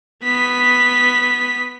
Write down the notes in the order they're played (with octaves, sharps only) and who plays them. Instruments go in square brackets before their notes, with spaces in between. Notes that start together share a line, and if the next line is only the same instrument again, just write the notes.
[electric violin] B3 B6